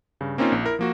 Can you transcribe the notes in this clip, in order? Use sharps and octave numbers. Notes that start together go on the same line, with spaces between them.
G2 C#3
A#3 C4 C#4 D#4 F4
A#1
E4 A#4
F3 A#3 F#4